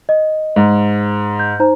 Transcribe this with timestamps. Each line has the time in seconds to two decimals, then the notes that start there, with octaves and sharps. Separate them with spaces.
0.09 D#5
0.56 G#2
1.39 G6
1.60 D#4 C5 A#5